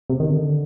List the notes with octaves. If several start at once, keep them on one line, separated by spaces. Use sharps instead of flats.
C3
D#3
D3